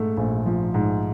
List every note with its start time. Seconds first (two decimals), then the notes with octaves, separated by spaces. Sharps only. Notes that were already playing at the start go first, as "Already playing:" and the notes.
Already playing: G#2 A3
0.17 A#1
0.46 F3
0.74 G#2